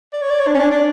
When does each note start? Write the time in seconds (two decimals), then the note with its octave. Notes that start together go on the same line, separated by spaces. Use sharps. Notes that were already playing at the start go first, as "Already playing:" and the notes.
0.13 D5
0.22 C#5
0.30 D5
0.39 C#5
0.47 D4
0.55 C#4
0.59 D4
0.71 D4